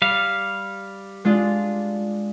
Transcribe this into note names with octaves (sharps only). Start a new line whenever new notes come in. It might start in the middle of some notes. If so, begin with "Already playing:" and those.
G3 F5
G#3 D4 F4